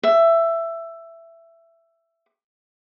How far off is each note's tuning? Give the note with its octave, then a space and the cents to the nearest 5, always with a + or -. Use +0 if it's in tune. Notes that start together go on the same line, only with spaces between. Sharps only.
E5 +15